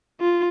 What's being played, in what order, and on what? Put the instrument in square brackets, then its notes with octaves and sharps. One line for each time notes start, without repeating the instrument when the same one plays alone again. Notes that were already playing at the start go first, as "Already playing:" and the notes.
[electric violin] F4